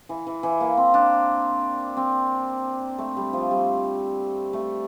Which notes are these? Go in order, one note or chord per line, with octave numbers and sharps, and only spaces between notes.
E3
E3
E3
A#3
C4
D4
C4
A3
G3
F3
G3
A3